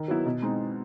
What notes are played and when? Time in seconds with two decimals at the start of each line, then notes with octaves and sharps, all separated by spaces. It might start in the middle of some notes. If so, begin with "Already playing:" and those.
Already playing: D#3
0.08 F#3 B3 E4
0.26 B2
0.42 G#3 C4 D#4